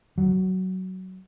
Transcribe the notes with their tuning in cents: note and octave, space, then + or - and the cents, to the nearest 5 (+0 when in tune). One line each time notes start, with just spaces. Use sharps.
F#3 +15